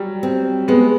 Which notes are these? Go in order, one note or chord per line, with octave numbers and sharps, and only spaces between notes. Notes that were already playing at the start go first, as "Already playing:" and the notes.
Already playing: F#3 G3
C4
G#3 B3